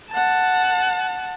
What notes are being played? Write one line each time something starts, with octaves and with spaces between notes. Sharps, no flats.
F#5 A5